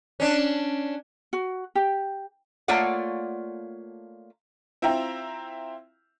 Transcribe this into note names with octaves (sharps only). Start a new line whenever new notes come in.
C#4 D4
F#4
G4
A3 A#3 F4 C#5 D5 F#5
C4 E4 F4 E5 G5 A#5